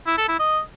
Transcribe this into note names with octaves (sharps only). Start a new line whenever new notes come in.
E4
A4
E4
D#5